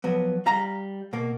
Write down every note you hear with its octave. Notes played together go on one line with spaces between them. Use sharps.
F3 F#3 B3
G3 F5 A#5
B2 A#3